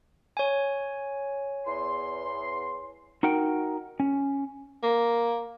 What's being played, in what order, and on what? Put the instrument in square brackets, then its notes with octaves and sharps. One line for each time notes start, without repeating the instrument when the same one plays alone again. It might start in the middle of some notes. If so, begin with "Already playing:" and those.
[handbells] C#5 G#5
[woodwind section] E2 C6
[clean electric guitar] D#4 F#4 A#4 F#5 G5
C#4
[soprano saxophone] A#3